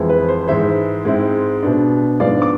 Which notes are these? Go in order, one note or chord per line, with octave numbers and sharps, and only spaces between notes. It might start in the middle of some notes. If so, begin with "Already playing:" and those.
Already playing: F2 E3 G#3
B4
C5
G#2 E3 G#3 C5 E5
G#2 G#3 C4 E4
B2 B3 D4
G#2 F3 B3 D4 D5 F5
D6